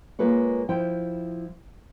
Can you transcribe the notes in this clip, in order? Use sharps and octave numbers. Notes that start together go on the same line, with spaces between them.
G#3 A#3 F4 G#4 B4 C#5
F3 E4 G5